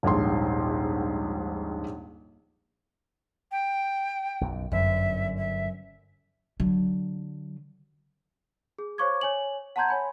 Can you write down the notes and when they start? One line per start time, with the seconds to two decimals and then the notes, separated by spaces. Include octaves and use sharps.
0.03 D#1 A#1 G#2 C6
3.51 G5
4.41 B1 F#2
4.72 G1 F#2 E5
5.37 E5
6.60 D3 F#3
8.78 G#4
8.98 C5 C#5 F5 C#6 D6 G#6
9.21 C#5 G#5 F#7
9.76 F#5 A5 A#5 C6 G6 G#6
9.89 C#5 G#5 B5